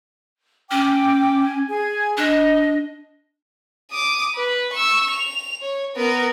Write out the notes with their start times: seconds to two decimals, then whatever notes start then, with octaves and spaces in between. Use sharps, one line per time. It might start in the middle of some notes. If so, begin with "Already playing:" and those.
0.71 C#4 G5 D6
1.44 G#5
1.69 G#4 G#5
2.17 D4 D#5
3.91 D6 D#6
4.35 B4
4.73 C#6 E6
5.11 F7
5.61 C#5
5.96 B3 A#4